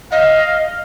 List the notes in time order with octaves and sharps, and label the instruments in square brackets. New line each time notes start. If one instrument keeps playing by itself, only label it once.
[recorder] D#5 [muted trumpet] F5